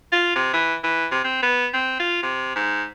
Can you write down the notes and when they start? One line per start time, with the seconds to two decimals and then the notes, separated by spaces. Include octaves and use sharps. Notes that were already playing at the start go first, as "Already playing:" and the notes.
0.12 F4
0.36 C3
0.53 E3
0.84 E3
1.11 C3
1.24 C4
1.42 B3
1.74 C4
2.00 F4
2.23 C3
2.56 G#2